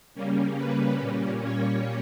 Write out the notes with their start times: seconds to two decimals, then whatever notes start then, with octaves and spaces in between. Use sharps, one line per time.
0.14 C#3 G3 A#3 C#4
0.56 B4
1.00 A#2 G3 A#3 C#4
1.43 C#5